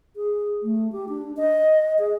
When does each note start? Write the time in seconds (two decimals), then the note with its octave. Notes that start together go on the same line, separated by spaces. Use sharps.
0.16 G#4
0.63 A3
0.92 G4
1.09 D4
1.37 D#5
1.99 G#4